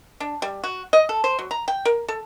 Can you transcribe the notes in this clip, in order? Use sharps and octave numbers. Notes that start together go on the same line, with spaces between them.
D4
G3
F#4
D#5
A4
C5
F#3
A#5
G5
A#4
A4